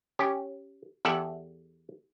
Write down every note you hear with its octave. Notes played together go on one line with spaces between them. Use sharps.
C#4 G4
E2 G4 A4 E5 F#5